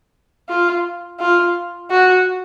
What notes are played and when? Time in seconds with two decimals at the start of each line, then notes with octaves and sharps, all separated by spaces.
0.49 F4
1.20 F4
1.90 F#4